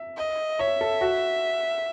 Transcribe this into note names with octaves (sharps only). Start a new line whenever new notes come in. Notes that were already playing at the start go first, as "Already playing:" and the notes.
Already playing: E5
D#5
C#5 E5
A4
F#4